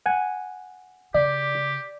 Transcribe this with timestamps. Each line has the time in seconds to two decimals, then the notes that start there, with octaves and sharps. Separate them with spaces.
0.06 F#5 G#5
1.14 C#3 G4 D5